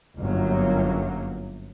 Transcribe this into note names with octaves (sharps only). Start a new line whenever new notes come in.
G1 F#2 F#3 A#3